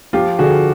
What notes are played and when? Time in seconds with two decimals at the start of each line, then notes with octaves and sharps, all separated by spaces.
0.13 F3 F4 G4
0.39 D3 F#4 G#4